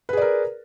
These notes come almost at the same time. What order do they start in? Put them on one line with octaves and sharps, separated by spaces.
B4 G#4 D5 A#4